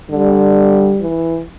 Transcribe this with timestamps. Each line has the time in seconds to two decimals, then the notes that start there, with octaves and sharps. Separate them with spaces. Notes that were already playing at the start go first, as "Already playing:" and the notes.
0.10 D3 G3
1.01 E3